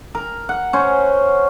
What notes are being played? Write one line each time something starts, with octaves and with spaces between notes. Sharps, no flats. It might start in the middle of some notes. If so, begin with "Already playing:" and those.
A#4
F#5
C#4 C5